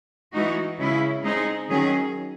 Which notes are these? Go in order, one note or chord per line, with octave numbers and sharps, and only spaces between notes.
E3 G#3 D#4 F#4
C#3 G#3 C#4 E4
G#3 C4 D#4 G#4
D#3 F#3 C#4 G#4